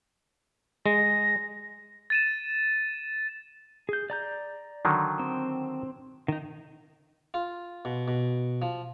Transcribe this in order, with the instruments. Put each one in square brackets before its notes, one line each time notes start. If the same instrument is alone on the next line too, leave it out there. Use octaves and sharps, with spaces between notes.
[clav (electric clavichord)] G#3 [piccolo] A#6
[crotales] A6 D#7 E7
[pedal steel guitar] G#4 G6
D5 A#5 G6
[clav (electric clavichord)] D3 D#3 F#3
[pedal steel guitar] C4
D#3 D#4
[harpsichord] F4
B2
B2
F3